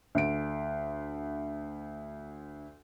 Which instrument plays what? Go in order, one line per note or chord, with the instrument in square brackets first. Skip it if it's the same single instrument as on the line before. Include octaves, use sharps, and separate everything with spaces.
[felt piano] D2 D7